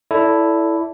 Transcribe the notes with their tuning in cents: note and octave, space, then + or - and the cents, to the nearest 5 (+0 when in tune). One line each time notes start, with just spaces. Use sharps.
E4 +0 A4 +0 D5 -25